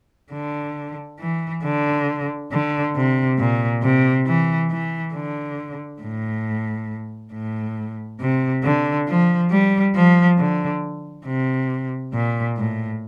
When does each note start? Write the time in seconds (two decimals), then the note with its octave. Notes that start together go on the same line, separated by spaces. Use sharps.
0.33 D3
1.20 E3
1.64 D3
2.52 D3
2.95 C3
3.38 A#2
3.82 C3
4.26 E3
4.71 E3
5.14 D3
6.02 A2
7.33 A2
8.20 C3
8.64 D3
9.08 F3
9.51 G3
9.95 F3
10.38 D3
11.26 C3
12.13 A#2
12.57 A2